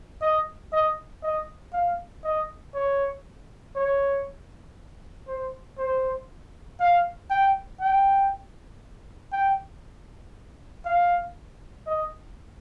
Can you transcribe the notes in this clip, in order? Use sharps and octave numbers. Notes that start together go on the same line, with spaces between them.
D#5
D#5
D#5
F5
D#5
C#5
C#5
C5
C5
F5
G5
G5
G5
F5
D#5